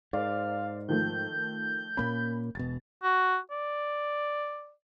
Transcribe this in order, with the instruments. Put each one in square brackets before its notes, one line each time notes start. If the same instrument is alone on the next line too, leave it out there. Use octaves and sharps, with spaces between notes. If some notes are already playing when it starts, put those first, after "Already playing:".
[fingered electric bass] G#2 [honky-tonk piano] A#4 C5 D5 [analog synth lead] F5
[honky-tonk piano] D#3 F3 A3 [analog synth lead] G6
[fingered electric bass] A#2 A#3 C#4 [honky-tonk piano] B5
[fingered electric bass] E1 B2 [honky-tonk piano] A6
[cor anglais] F#4
D5